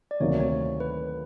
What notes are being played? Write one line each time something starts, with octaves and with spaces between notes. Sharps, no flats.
D5
D2 C3 D#3 F#3 A#3 C#5
C#5
B4